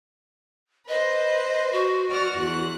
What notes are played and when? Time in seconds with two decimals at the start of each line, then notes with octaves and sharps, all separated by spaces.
0.88 B4 C5 D#5
1.72 F#4
2.09 D5 F#5 F6
2.39 E2 F#6